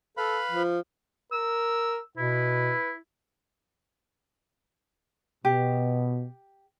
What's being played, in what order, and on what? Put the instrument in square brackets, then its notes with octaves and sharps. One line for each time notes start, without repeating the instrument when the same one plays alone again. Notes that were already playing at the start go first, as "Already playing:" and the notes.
[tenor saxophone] A4 [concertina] B4 F5 B5
[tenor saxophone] F3
[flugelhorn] A#4 [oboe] E6
[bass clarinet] B2 [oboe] E4 [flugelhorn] B4
[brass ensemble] B2 [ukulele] G4